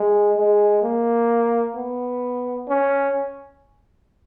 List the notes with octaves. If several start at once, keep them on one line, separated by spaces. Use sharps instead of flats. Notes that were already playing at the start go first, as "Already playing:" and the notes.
Already playing: G#3
G#3
A#3
B3
C#4